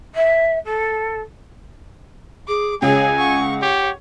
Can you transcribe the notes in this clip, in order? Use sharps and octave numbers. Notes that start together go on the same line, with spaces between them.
E5
A4
G#4 D6
C#2 G#4 C#5 G#5
F#5 C#6
G4 C#5